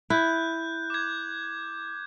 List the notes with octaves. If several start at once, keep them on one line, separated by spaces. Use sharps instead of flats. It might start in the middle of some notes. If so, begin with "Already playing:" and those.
E4 F#6 G6
D6 G#6